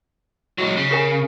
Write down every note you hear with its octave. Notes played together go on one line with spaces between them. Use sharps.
F#3 G#3
C#3
G#4 A#4 G#5